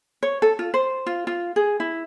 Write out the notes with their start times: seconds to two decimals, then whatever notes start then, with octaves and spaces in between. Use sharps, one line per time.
0.23 C#5
0.42 A4
0.59 F4
0.74 C5
1.06 F4
1.27 F4
1.56 G#4
1.80 E4